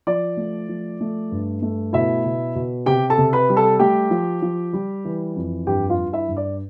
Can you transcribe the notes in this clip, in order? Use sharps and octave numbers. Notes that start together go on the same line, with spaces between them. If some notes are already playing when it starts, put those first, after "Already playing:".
F3 D5
A3
F3
A3
G2
A3
B2 E4 E5
B2
B2
C3 G4 G5
A4 A5
C3
B4 B5
G3
A4 A5
A3 G4 G5
F3
F3
G3
E3
F2
G2 G4 G5
F4 F5
G2
E4 E5
G2
D5